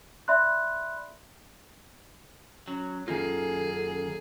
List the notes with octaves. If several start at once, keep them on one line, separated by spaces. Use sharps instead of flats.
D5 E5 B5 C6 F#6
F#3 C#4
F#2 D#3 A#3 C#4 F4 G#4 A4